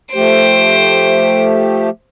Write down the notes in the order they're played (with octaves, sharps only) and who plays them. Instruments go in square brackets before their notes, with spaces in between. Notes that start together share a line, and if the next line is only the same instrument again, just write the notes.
[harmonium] F3 A3 G4 [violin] C5 D7